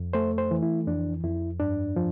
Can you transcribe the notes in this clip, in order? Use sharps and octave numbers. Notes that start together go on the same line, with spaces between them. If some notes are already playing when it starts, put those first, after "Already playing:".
Already playing: F2
A3 C5
C5
E3
E4
F2 D4
F2 E4
G2 D4
F3